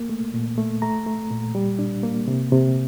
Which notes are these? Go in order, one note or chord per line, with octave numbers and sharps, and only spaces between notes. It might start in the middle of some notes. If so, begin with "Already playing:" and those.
Already playing: A#3
A3
A#2
A3
A3 A#5
A3
A#2
G3
D4
A#3
C3
C3